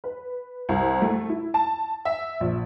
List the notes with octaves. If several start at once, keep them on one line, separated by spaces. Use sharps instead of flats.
B4
C2
A3
E4
A5
E5
A#1